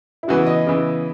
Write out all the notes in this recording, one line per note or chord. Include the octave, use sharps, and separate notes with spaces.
E4
C#3 E3 G#3 B3 F#4
D#5
C#3 E3 B3